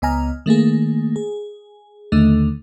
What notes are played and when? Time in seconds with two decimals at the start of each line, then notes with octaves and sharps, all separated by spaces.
0.02 C#2 B3 D#5 G#5 A#5 F6
0.46 D#3 A3 A#3 G#4
1.16 G#4
2.12 D#2 D3 D#3 A3